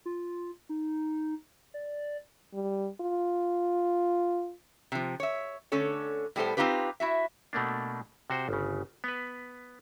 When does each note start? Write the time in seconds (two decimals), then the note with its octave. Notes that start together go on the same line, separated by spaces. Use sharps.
0.06 F4
0.69 D#4
1.74 D5
2.53 G3
3.01 F4
4.92 C3 F3
5.20 C#5 E5
5.72 D3 A3 C#4 A4 C#5
6.36 A2 G3 B3 A4 C5 A5
6.57 C4 C#4 D#4 F4 G4 B4
7.00 E4 F#4 E5
7.53 B2 A3 A#3 D4
8.30 C3 F#4 C5
8.49 G1 C#3
9.04 B3 B4